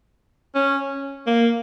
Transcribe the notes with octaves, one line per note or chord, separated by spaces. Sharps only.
C#4
A#3